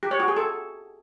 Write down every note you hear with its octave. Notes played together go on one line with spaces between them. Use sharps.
G4
C#5
F#4
G#4
A4